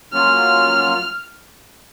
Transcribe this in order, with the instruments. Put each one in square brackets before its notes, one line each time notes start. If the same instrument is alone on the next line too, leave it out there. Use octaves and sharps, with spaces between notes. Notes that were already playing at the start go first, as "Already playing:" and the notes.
[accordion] F#3 A#3 C#4 F4 [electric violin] F6